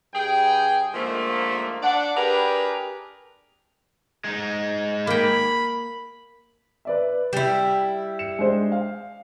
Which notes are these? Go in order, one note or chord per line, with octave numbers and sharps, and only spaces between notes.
G2 G#4 G5
G#2 D3 F3 A3 A#3
D4 D5 F#5
D4 G4 G#4 A#4 B4
G#3 D#4
A#3 G5 B5
B4 D5 E5
G3 E4 G4
C#7 E7
G#3 D4 C5
F5